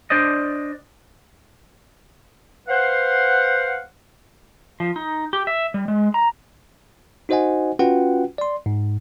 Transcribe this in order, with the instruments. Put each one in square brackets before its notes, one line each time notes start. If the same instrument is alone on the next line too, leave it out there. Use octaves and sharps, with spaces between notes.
[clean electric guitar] D4 C5 D5 D#5
[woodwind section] B4 C5 F5 F#5
[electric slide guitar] F3
D#4
G4
E5
G3
G#3
A#5
[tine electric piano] D#4 F#4 C5 D#5 F#5 G#5
C#4 F4 F#4 B4 F#5 G5
D5 C6
G#2